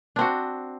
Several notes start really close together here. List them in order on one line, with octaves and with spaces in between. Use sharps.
D4 C4 F#4